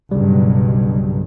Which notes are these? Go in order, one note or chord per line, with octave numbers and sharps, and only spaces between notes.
B1 G2 C#3 G3